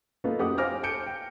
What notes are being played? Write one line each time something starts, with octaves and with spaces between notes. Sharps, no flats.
A#3 B3 D#4 F4 A4 B4
F#2 G4 F#5 D6 D#6
C5 F5 G#5 D6 F6 A#6
G#5 A5 G6 C#7 D7
G5